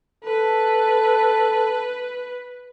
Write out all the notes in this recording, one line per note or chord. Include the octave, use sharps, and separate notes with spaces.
A4 B4